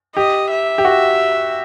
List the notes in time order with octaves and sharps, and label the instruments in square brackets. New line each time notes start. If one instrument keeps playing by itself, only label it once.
[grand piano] G4 [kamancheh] D#5
[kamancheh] E5
[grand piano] G4
F#4